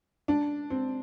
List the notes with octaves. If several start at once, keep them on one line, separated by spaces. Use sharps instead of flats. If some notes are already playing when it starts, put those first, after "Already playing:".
D4
C4